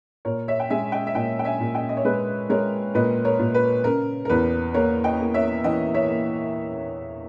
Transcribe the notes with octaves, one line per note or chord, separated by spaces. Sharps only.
A#2 A#4 C#5
C#5 E5
G5
G#3 E5 G#5
D#5 G5
E5
A#2 D#5 G5
G5
E5 G#5
A#2
D#5 G5
D#5
C#5
G#3 B4
G#3 A#4 C#5
A#2 B4 D#5
A#4 C#5
A#2
B4
C#3 A#4
A#4
E2 B4
A#3 A#4 C#5
D#5 G5
A#3
C#5 E5
E3 D#5 G5
C#5 E5
A#3